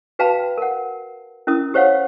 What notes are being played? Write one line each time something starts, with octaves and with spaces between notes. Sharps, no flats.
F#4 B4 F5 G5 A5 B5
A#4 F#5
C#4 E4 A#4 D#6
G4 C5 C#5 F5 F#5